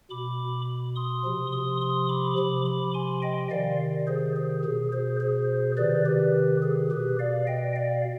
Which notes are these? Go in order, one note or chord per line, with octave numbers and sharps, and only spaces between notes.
B2 B5 D6
C6 D#6
C3 F3
C6 D#6
C6 D#6
B5 D6
C3 F3 B5 D6
B5 D6
G#5 C6
D#5 G5
C3 D#3 D5 F5
G#4 C5
G#4
B2 G#4
G#4 C5
G#4 C5
C3 D#3 B4 D5
G4 B4
G#4
B2 G4 B4
D5 F5
D#5 G5
D5 F5